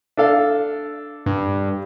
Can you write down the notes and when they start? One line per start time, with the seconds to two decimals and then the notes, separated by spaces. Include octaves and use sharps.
0.17 D4 A4 F5
1.26 G2